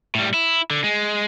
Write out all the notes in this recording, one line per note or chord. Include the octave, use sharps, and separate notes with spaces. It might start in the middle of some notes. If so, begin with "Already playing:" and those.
A2 G3
E4
D3
G#3